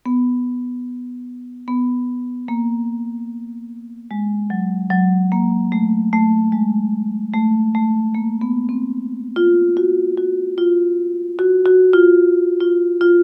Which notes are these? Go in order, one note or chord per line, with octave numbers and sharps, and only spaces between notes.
B3
B3
A#3
G#3
F#3
F#3
A#3
A3
A3
G#3
A3
A3
A#3
B3
C4
F4
F#4
F#4
F4
F#4
F#4
F4
F4
F4